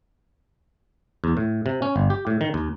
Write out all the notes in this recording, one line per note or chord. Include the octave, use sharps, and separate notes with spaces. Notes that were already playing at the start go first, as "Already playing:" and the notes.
E2
A2
C3
C#4
G1
G4
A2
D#3
D#2